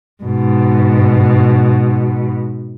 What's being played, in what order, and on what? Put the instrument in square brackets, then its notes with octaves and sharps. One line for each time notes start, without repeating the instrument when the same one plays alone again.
[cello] G#2 B2